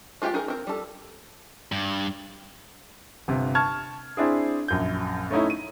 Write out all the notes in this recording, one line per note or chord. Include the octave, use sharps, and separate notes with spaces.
G#3 F4 G4 F5 G5
D#4 G#4 A#4
C4 A#4
G3 A4
G2
G1 C3
A5 C#6 F6 G#6
C4 D4 E4 G#4
A#1 F#2 G6
A3 C#4 D#4 E4
D#7